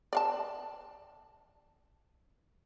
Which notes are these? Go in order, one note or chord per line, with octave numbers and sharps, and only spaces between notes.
D5 F5 A5